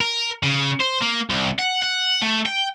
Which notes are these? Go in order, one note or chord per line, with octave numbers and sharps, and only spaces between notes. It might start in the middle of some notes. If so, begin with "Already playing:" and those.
A#4
C#3
C5
A#3
C2
F#5
F#5
A3
G5